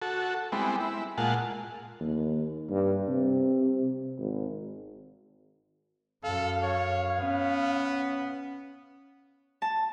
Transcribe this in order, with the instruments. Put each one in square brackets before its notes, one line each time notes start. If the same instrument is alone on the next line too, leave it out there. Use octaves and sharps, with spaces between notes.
[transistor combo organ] F#4 A4
G3 G#3 B3 C4 E4
E4
A#2 G#3 F4 F#5 A5
[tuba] D#2
G2
C3
G#1
[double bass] F#2 [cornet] A4 [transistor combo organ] F5
[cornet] C#5
[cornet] B3 [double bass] C#4
[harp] A5